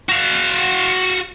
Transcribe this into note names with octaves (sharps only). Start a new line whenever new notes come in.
F#4 F5